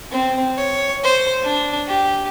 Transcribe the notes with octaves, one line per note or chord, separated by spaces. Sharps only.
C4
C#5
C5
D4
G4